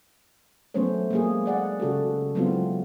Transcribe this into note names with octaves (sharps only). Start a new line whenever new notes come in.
F#3 A3 B3 C#4 C5 C#5
G#3 A#3 G#4
G#4 D5 F#5
C#3 F#4 G4 A4
F#3 G#3 B3 C4 E4 F4